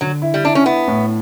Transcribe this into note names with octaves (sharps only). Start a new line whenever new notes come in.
D3 F#3
E4
G3
D4 E4
C#4
B3 E4
A2